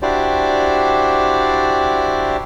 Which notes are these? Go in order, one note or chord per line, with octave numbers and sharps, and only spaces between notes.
D4 E4 F#4 G4 C5 D5